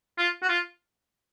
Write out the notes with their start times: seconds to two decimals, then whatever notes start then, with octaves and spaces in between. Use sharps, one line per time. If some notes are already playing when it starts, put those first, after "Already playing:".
0.18 F4
0.42 F#4
0.49 F4